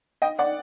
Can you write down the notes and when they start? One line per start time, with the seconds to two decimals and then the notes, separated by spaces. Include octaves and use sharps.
0.22 D#5 G5
0.39 D5 F#5